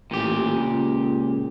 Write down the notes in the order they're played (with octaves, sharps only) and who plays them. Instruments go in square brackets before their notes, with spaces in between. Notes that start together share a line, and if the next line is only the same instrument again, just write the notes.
[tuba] A1 [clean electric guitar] A#2 G4
[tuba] C#2